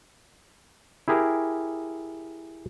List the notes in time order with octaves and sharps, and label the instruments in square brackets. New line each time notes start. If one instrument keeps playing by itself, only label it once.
[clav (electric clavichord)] E4 G4 G#4 A#4